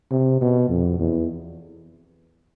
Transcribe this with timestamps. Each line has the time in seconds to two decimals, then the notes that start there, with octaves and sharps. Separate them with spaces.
0.11 C3
0.41 B2
0.69 F2
1.00 E2